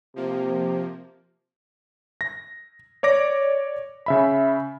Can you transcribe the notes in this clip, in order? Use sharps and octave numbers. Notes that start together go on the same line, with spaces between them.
C3 F3 A#3
A#6
C#5 D5 D6 A#6
C#3 E5 B5